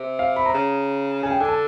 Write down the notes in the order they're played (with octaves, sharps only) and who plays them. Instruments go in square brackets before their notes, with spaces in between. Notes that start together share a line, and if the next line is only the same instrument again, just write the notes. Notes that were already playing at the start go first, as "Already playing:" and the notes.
Already playing: [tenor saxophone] C3
[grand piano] F5
B5
A#5
[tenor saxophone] C#3
[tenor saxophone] C#3 [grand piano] G#5
[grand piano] G5
[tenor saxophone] D3 [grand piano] G#5
[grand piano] A5